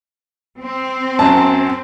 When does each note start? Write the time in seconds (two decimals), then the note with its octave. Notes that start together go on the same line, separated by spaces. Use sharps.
0.62 C4
1.19 F#2 A5